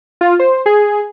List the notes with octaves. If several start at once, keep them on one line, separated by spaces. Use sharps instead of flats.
F4
C5
G#4